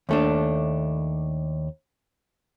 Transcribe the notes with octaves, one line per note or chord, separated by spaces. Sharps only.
D#2 A3 D4